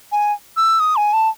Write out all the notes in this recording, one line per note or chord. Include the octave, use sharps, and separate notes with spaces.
G#5
E6
D#6
G#5
A5